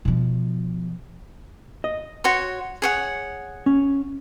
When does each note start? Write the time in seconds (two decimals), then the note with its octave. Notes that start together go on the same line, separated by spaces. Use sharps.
0.05 B2 F3
1.84 D#5
2.24 F#4 C#5 C6
2.82 G#4 C#5 F#5
3.66 C#4